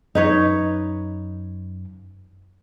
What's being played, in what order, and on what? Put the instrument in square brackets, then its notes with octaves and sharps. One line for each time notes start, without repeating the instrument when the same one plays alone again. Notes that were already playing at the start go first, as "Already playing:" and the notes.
[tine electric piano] F#2 [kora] D#4 B4 C#5